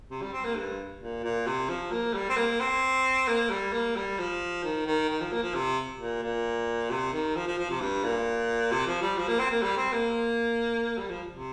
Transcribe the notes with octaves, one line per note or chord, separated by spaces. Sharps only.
C3
G3
C4
A#3
G2
A#2
A#2
C3
F3
A#3
G3
C4
A#3
C4
A#3
G3
A#3
G3
F3
D#3
D#3
D#3
F3
A#3
F3
C3
A#2
A#2
C3
D#3
F3
F3
F3
C3
G2
A#2
C3
F3
G3
F3
A#3
C4
A#3
G3
C4
A#3
G3
F3
C3